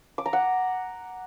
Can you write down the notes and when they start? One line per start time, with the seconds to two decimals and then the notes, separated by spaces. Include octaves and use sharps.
0.18 D6
0.26 A#5
0.33 F#5